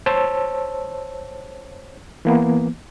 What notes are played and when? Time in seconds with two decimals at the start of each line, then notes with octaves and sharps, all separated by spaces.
0.06 C5 C#5 A5 E6
2.25 E3 A#3 B3